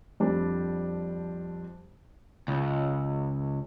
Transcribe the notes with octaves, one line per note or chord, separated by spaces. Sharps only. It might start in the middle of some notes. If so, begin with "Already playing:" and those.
F2 G3 C4 D4
C#2